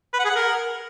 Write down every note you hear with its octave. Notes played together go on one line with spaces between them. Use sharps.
B4
F#5
G#4
F#5
A#4